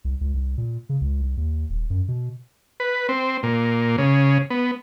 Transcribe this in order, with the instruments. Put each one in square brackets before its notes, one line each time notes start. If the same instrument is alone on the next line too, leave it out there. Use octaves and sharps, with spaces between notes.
[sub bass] C2
C#2
C2
A#2
C#3
C#2
C2
D#2
D#1
F#2
B2
[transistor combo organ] B4
C4
A#2
C#3
B3